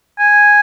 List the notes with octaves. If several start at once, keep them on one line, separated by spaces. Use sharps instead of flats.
G#5